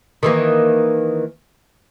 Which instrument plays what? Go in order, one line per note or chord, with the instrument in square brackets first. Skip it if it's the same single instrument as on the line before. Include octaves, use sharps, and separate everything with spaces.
[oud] D#3 E3 A#3